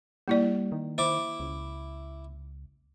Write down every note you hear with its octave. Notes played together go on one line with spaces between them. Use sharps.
G3 A#3 E4 D5
D#3
E4 C5 D6
C#2